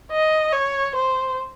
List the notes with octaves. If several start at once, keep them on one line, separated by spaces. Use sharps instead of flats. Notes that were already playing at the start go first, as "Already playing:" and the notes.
D#5
C#5
C5